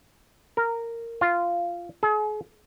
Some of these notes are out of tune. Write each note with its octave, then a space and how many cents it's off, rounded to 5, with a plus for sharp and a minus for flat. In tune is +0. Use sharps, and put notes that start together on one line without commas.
A#4 -10
F4 -10
G#4 +40